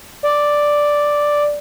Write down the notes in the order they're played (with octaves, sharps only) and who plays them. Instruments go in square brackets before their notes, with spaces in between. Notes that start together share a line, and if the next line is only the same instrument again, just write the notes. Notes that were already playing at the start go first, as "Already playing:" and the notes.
[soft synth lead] D5